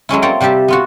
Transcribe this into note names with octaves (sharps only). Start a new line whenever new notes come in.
F#3 G#3 C#4 E4
A#3 C4 C#5 D5 G5 A#5
C3 G3 G4 E5 A5
B3 F4 F#4